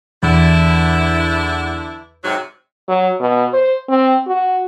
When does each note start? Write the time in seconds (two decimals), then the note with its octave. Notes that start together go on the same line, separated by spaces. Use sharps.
0.23 E2 D3 D4 E4
2.24 G#2 C3 F#3
2.88 F#3
3.20 B2
3.53 C5
3.89 C4
4.27 F#4